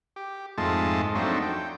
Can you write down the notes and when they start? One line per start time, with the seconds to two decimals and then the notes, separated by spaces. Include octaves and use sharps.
0.16 G4
0.58 F2 G#2 G#3 A3 F4 A5
1.15 F3 F#3 A3 C4 D4 D#4
1.42 G5